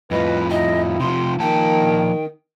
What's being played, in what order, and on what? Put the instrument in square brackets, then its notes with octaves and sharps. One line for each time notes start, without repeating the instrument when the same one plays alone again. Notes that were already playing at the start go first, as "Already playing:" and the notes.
[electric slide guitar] F2 A2 F3 [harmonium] B4 [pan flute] D#5
[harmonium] D#4 E4 [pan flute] D#5
[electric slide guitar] C3 F3 [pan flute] C6
[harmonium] D#3 [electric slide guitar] F3 A#3 A5 [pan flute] G5